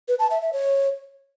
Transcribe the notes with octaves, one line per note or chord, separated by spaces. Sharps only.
B4
A5
E5
E5
C#5